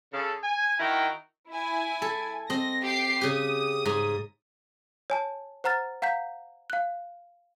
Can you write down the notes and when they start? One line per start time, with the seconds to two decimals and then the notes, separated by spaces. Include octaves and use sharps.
0.13 C#3 A4
0.43 G#5
0.79 D#3 E4 F#4 G5 A#5
1.50 E4 G#5
2.02 A4
2.50 C4 D#5 A#6
2.84 G4 G5 C7
3.21 C#3 G4 D#6
3.85 G#2
5.10 C#5 G#5 A5
5.64 C5 F#5 A#5 F6 A6
6.02 F5 F#5 A#5 G6 B6
6.70 F5 F#6